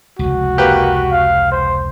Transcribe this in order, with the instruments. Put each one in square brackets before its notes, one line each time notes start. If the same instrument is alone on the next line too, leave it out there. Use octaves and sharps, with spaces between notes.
[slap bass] F1 C#2 [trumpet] F#4
[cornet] A#3 [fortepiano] G4 B4
[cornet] F5
C5